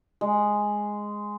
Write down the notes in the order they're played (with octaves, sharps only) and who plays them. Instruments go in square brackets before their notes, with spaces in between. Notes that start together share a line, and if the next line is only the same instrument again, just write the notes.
[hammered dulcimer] G#3